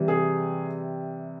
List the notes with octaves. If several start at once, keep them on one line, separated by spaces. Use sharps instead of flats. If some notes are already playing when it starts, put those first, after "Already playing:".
Already playing: C3 E3 G3
G#4